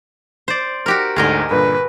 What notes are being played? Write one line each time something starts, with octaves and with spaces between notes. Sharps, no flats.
C5 D5
F#4 G4 A#4
D2 G#2 D3 G#4 A#4 D#5
G2 A#2 D3 B4